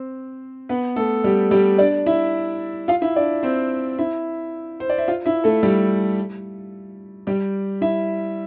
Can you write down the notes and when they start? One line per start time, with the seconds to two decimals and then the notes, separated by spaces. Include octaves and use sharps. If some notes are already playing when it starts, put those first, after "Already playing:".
Already playing: C4 C5
0.69 B3 B4
0.96 A3 A4
1.24 G3 G4
1.51 G3 G4
1.78 D4 D5
2.06 E4 E5
2.88 F4 F5
3.02 E4 E5
3.16 D4 D5
3.43 C4 C5
3.99 E4 E5
4.80 C5
4.90 D5
4.98 E5
5.08 F4 F5
5.26 E4 E5
5.44 A3 A4
5.63 G3 G4
7.27 G3 G4
7.81 E4 E5